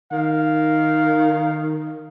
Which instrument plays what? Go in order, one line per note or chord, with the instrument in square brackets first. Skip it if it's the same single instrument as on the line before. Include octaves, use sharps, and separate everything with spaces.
[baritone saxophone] D#3 [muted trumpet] F5